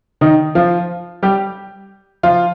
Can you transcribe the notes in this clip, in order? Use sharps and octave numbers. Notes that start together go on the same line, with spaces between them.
D#3 D#4
F3 F4
G3 G4
F3 F4